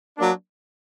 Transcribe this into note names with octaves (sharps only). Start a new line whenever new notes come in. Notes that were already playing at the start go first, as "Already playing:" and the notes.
F#3 A#3 D4